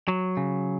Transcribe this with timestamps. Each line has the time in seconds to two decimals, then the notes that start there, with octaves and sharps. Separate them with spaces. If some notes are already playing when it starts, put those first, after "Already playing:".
0.08 F#3
0.37 C#3